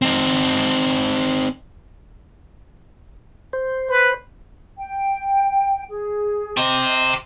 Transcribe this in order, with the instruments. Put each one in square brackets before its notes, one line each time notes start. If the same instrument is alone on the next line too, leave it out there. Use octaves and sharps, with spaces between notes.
[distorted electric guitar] C4 D#4
[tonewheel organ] C5
[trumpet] B4
[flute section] G5
G#4
[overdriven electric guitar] G4 C5 [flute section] D#5